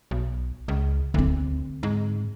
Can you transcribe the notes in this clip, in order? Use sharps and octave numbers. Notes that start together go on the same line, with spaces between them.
B1
C#2
D2 D3 C4
G#2